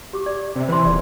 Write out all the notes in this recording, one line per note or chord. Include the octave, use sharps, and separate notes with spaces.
G4 D6
D5
C3
E3 C5 A5 C6
D#1 D5